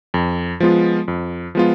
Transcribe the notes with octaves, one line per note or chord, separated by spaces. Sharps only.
F2
F3 G#3 B3 F4
F2
F3 G#3 B3 F4